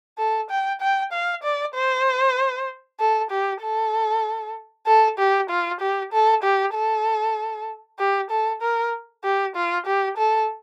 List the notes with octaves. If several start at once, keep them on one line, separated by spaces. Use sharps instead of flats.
A4
G5
G5
F5
D5
C5
A4
G4
A4
A4
G4
F4
G4
A4
G4
A4
G4
A4
A#4
G4
F4
G4
A4